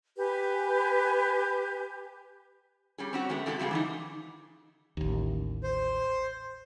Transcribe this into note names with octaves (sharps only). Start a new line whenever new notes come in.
G4 B4 G#5
G3 C#4 G#4
C4 C#4 F#4
F#3 G#3 A3 B3
F#2 C3 G#3 F#4 A4 E5
C#3 G3 F#4 G#4
E3 F3 D#4
A1 D#2
C5